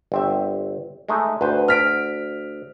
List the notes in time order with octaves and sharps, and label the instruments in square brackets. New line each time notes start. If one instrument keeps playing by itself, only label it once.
[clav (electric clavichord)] G1 C4 E5
G#3 A3 D#4
[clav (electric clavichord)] D2 C5 [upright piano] B4
[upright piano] F6 B6 D7